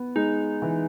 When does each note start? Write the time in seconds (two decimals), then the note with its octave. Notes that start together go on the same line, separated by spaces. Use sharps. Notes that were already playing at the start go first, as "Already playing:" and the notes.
Already playing: B3
0.15 G#3 D#4
0.62 E3